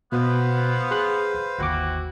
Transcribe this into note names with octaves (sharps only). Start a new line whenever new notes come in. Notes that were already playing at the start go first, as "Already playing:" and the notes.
B2 B3 B4 C5 F5
G#4 C6 F#6
G1 D#2 C4 E4 F#4 D6